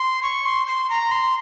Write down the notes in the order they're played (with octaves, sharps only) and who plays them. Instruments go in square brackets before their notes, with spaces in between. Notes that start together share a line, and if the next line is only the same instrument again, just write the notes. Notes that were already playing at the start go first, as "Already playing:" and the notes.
Already playing: [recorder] C6
C#6
C6
C6
A#5
C6